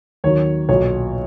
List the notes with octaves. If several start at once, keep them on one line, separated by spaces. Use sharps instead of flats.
D#2 D#3 F#3 C#5
B1 A#2 F#3 C#5